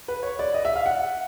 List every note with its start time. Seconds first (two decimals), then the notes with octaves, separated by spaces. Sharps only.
0.08 B4
0.23 C#5
0.39 D5
0.54 D#5
0.65 E5
0.76 F5
0.86 F#5